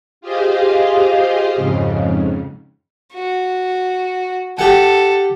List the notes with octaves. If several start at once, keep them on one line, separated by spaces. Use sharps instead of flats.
F4 G4 G#4 C5 D#5 F5
F2 G#2 C#3
F#4
G4 A4 F#5